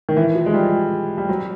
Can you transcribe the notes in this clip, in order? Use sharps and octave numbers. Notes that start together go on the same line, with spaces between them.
D#3
E3
F3
G#3
G3
G3
F#3